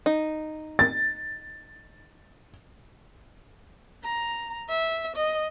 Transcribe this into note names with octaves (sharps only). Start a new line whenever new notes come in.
D#4
A6
A#5
E5
D#5